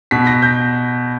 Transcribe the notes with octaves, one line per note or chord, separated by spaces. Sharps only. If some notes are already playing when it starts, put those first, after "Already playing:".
B2 B6
A#6
G6